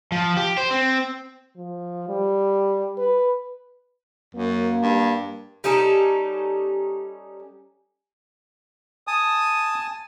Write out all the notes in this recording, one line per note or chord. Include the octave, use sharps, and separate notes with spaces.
F3
G4
C5
C4
F3
G3
B4
F#2 A#3
G2
G3 C#4 D#4 A4
G#5 A5 D#6